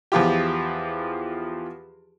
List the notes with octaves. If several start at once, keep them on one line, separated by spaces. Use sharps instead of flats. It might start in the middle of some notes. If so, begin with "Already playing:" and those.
E2 F3 F4 G4